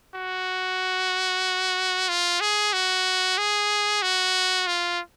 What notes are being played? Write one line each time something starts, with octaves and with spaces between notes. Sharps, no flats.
F#4
F4
G#4
F#4
G#4
F#4
F4